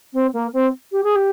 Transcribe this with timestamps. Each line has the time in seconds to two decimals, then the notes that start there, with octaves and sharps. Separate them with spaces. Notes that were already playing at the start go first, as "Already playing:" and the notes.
0.13 C4
0.33 A#3
0.53 C4
0.92 G4
1.04 G#4
1.16 G4